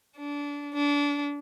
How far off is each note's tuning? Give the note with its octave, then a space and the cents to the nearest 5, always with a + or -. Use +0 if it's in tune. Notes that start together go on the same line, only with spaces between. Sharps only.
D4 -25
D4 -30